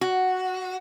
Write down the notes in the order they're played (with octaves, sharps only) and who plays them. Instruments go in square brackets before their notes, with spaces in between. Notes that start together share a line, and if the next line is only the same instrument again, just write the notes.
[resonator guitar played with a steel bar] F#4